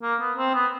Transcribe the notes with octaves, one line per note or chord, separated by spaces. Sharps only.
A#3
B3
C4
B3